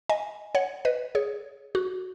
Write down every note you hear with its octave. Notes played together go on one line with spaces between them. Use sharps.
D#5 G#5
C#5 F#5
B4 D#5
G#4 C#5
F#4